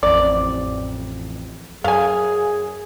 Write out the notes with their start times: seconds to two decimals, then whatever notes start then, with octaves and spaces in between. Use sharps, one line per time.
0.03 A1 F2 D5
1.84 F#2 G#4 F5 G#5